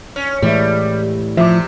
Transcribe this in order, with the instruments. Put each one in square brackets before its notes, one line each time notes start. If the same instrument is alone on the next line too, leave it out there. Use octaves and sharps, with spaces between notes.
[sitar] C#4
[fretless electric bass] A2 E3 [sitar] G3 [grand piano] G#3 E5
[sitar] C3 [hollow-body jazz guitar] F3 [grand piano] E5 D6